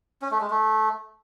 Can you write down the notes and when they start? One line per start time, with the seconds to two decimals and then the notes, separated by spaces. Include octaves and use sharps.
0.22 C#4
0.31 A3
0.41 G#3
0.50 A3